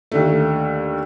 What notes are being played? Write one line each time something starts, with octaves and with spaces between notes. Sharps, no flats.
D#2 D3 A3